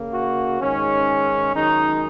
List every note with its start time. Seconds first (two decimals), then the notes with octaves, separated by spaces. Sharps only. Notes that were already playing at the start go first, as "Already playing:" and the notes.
Already playing: C#3 A#3
0.12 F#4
0.60 G#2 D#3 G#3 C#4
1.54 F#2 D#3 G#3 D#4